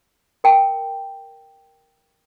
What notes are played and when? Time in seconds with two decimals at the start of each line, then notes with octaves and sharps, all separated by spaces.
0.44 A#4 G5 A5